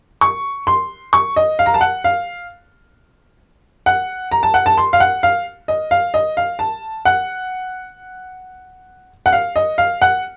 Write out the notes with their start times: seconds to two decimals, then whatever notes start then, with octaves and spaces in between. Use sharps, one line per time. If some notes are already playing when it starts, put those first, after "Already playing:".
0.21 C#6
0.67 C6
1.13 C#6
1.36 D#5
1.59 F5
1.66 A#5
1.74 A5
1.81 F#5
2.04 F5
3.86 F#5
4.32 A#5
4.43 A5
4.54 F#5
4.66 A5
4.78 C6
4.93 F5
5.00 F#5
5.23 F5
5.68 D#5
5.91 F5
6.14 D#5
6.37 F5
6.59 A5
7.05 F#5
9.26 F#5
9.33 F5
9.56 D#5
9.78 F5
10.02 F#5